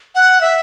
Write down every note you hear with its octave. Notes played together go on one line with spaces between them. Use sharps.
F#5
E5